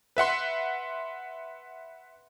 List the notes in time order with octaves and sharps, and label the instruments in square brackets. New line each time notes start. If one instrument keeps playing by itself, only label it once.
[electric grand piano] B4 E5 F#5 C6